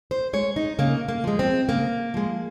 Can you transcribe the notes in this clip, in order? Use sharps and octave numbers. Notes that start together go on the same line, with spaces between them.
C5
G#3 C#5
D#4
C#3 A#3
A#3
F3 G#3
C4
C#3 A#3
F3 G#3